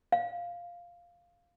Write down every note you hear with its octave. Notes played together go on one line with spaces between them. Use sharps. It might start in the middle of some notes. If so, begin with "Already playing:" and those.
F5